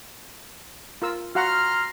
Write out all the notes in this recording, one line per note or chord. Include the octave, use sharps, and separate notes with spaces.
F4 A#4 E6
F#4 F5 F#5 A#5 C6 F6